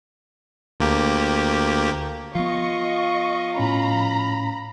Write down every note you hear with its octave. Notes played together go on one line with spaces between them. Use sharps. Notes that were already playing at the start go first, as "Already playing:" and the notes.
D2 A#3 G4
F3 B3 F4 D#5 C#6
A2 C#4 A#5 B5